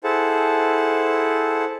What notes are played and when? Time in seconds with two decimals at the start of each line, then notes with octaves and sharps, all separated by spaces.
0.04 E4 G#4 A4 C5 F#5 A5